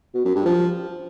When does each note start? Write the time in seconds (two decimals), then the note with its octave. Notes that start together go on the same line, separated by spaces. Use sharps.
0.14 B2
0.25 F#2
0.35 G2
0.45 F3